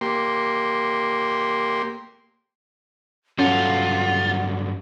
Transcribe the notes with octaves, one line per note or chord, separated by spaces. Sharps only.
A#3 G4 C6
G2 F#3 C#4 F4 A4 F#5